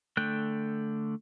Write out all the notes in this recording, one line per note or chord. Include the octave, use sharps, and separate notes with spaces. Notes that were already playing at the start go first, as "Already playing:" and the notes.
D3 A3 G5 F#6